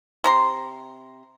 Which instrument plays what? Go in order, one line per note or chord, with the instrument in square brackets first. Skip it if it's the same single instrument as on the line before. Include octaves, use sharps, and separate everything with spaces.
[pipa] C3 A#5 C6